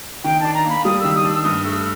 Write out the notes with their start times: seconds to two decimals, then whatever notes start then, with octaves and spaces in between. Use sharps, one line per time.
0.24 D#3 G5
0.40 D4 A5
0.54 A#5
0.65 A#3 B5
0.85 G3 D#6
1.00 D#3 E6
1.15 D#6
1.24 D4 E6
1.44 G2 D#6
1.65 A3 E6